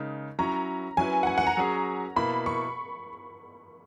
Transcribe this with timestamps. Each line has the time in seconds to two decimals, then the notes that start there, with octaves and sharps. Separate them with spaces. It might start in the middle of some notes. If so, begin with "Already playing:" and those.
Already playing: C#3 G#3 D#4 A#4
0.39 F#3 C#4 E4 A#5
0.97 F#3 C#4 E4 B4 G#5
1.23 F#5
1.27 G#5
1.38 F#5
1.47 A#5
1.57 F#3 C#4 G#4
2.16 B2 A#3 E4 B5
2.46 C#6